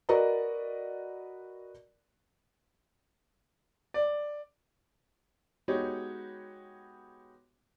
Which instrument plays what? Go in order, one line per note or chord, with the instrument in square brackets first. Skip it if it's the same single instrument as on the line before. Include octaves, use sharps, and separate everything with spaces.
[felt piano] F#4 A#4 B4 D5 D#5 A#5
[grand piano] D5
G#3 B3 D#4 F#4 G4 C#5